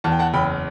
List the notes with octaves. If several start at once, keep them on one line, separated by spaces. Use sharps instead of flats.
E2 A5
G5
F#5 A5
F#1 G5 B5